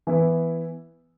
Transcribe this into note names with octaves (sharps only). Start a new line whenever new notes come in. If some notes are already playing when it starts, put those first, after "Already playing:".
E3 B3 E4